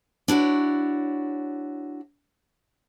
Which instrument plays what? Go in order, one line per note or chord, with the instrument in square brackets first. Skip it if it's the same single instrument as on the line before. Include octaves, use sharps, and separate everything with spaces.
[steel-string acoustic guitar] D4 E4 F#4 C#5